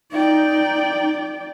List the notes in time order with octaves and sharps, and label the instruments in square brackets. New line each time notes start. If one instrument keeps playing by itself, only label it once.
[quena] D#4 [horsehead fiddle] D5 G5